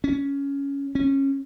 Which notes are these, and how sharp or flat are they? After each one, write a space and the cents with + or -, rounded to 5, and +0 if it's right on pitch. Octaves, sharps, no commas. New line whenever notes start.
C#4 +10
C#4 -20